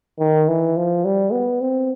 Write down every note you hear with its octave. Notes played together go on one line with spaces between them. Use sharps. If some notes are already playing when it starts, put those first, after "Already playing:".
D#3
E3
F3
G3
B3
C4